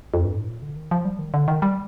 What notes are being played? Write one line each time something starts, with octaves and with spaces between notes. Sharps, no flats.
F2
G2
A2
A#2
D3
D#3
F3
G3
D#3
D3
D#3
G3